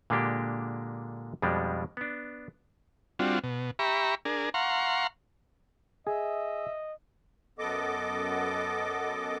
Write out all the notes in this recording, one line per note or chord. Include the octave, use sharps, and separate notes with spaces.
A#2 D3 G#3 A#3 D4 G4
F2 B2 F3 G3 G#3 D4
B3 D4
G3 C4 D4 F4 F#4
B2
G4 E5 A#5 B5 C#6
D4 G#4 A#4
F5 F#5 A#5 C6 C#6
G#4 D#5 E5
F#2 B3 A4 D#5 D6